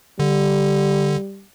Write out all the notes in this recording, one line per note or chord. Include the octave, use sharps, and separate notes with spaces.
D3 G3